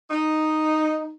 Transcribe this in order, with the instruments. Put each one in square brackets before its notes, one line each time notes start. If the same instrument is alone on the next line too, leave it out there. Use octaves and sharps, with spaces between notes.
[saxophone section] D#4